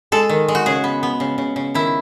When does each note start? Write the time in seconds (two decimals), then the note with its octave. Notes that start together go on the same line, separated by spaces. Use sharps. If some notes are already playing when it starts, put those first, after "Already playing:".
0.12 G#3 A4
0.29 D#3
0.48 G#3
0.55 F#4
0.66 C#3 G#4
0.84 B3
1.03 B3
1.20 C#3
1.38 C#3
1.56 C#3
1.74 D#3 E4